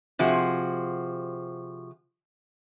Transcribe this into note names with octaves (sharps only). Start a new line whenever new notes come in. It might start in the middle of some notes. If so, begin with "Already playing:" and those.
C3 F3 F#4 G#4